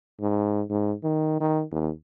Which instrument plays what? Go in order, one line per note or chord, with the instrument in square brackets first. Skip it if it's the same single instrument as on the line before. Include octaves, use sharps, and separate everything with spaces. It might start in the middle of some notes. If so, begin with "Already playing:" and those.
[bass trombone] G#2
G#2
D#3
D#3
D#2